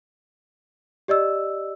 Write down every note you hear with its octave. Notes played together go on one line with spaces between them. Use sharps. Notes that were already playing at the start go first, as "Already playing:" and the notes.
G4 D5 D#5 E6